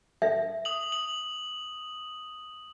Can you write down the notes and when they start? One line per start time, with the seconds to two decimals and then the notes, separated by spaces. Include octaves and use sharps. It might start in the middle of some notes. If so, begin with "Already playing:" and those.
0.22 E5
0.65 D#6 F#7
0.92 F#7